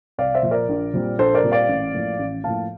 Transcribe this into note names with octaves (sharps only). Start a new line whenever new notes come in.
C2 D5 F5
C5 E5
A#2 F3
A#4 D5
A#1
A#2 G3 C4
A#1 A4 C5
A#4 D5
A#2 G3 C4
D5 F5
A1
A2 F3 A#3
A1
A2 F3 A#3 F5 A5